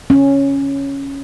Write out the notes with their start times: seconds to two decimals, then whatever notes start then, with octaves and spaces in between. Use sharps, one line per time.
0.10 C#4